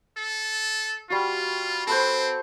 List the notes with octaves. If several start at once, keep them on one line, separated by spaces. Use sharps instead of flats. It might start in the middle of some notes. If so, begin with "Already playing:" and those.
A4
G3 F4 F#4
C4 A4 B4 C5